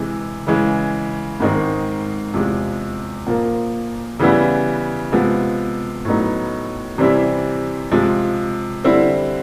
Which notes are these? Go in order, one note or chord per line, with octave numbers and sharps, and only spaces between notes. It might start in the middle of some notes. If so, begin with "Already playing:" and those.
Already playing: C3 E3 G#3
C#3 E3 G#3
G#2 D#3 G#3 C4 D#4
E2 C3 F3 G#3
A#2 F3 A#3
C#3 E3 G3 B3 E4
C3 F3 G#3 B3
A2 F#3 B3 D#4
C3 E3 G3 C4 E4
C3 F3 G#3
D3 G3 C4 E4